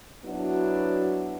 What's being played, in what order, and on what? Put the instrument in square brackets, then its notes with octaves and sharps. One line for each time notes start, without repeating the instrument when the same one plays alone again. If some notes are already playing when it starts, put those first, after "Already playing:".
[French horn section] F#3 B3 D4 E4 F#4